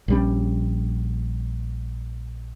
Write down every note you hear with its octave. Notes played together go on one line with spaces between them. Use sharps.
A#1 G3 C#4